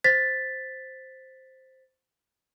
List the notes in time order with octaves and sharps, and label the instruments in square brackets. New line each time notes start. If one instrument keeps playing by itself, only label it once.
[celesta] C5 A6 B6